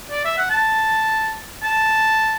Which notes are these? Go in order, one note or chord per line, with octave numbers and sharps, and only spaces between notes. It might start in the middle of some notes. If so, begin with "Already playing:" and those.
D5
E5
F#5
A5
A5